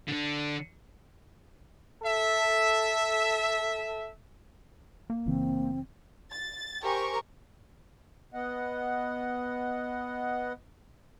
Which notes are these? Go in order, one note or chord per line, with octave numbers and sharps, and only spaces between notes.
D3 D4
A4 E5
A#3
F#1 C#3 E3 C4
A6
G4 A#4 C5 G#5 C#6
B3 D#5 F#5